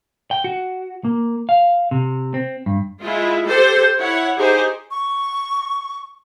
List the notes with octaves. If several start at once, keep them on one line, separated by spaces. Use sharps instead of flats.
G5
F#4
A#3
F5
C3
C4
G2
G#3 E4 F4
G4 A4 C5
E4 C#5 F#5
D#4 G4 G#4 C5
C#6